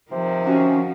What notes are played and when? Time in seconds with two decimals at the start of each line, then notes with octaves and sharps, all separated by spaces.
0.11 C3 D#3 F3
0.45 C#4 F4 F#4 G#5